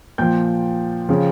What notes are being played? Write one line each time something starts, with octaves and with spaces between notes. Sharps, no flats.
A#2 F3 G5 G6
C#3 F3